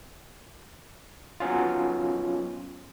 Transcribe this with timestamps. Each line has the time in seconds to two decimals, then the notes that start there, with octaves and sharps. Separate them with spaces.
1.40 F#3 B3 C#4 F4